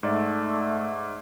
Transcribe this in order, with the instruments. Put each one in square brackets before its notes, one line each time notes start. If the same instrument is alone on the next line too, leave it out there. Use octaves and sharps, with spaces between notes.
[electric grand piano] G#2 D5 E5 [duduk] A3